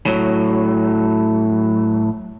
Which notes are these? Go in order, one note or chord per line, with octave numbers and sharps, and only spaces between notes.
A2 F#3